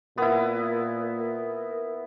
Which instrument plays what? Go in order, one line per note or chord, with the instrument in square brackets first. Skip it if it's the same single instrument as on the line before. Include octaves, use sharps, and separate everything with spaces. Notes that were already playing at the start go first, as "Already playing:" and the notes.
[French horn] A#2 [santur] B3 E4 [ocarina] A#4
[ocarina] A#4